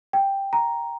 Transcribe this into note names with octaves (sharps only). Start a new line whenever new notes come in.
G5
A#5